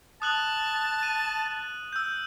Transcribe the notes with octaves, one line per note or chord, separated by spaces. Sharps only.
A5 D#6 F#6 F#7
D#7
E6 G6